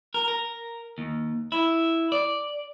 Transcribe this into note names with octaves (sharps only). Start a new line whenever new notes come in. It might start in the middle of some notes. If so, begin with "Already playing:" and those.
A#4
A#4
D#2
E4
D5